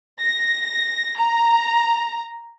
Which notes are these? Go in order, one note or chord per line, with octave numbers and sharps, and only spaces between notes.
A#6
A#5